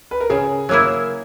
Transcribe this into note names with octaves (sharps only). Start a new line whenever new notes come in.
B4
A#4
C#3 G#4
F#3 A#3 E4 G#4 A#4